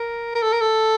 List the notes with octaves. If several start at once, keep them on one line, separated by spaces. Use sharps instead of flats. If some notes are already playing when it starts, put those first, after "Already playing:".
Already playing: A#4
A#4
A4
A#4
A4